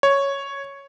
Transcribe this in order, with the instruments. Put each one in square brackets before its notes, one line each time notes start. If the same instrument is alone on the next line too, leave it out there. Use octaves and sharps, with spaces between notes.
[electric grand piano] C#5